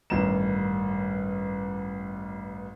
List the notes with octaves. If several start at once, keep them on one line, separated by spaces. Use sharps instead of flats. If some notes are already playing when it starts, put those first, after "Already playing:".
A1 G2 D#3 A#5 E7